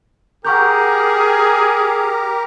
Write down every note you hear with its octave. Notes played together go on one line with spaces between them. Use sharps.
G4 G#4 A#4 F#5 A#5 C#6 G6